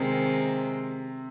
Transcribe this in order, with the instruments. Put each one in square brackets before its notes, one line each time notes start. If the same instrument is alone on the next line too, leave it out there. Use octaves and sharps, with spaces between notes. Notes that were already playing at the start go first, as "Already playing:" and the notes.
Already playing: [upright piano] C3 [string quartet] D#3 G#3 C4